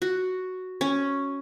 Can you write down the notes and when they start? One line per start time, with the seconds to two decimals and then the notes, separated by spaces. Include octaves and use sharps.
0.02 F#4
0.81 C#4